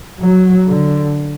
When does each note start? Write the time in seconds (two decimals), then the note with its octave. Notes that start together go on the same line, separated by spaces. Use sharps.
0.21 F#3
0.67 D3